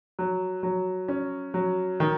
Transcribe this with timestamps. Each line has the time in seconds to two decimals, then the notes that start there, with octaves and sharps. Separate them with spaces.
0.19 F#3
0.63 F#3
1.08 C#4
1.54 F#3
2.00 D#3